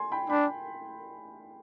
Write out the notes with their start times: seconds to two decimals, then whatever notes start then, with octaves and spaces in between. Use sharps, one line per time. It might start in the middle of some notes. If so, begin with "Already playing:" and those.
Already playing: G#5 C6
0.12 G5 B5
0.30 D4 G5 B5